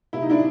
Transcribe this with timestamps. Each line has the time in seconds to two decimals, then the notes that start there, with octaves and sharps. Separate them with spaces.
0.13 C3 E4
0.22 D#4
0.30 D4 E4